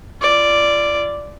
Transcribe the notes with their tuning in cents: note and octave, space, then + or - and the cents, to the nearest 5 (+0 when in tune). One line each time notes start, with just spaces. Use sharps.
F4 -35 D5 +0